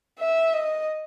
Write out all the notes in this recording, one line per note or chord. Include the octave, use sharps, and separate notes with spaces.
E5
D#5